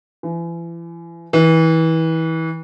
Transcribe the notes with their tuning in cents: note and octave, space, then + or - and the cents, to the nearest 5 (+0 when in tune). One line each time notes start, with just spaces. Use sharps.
E3 +35
E3 -30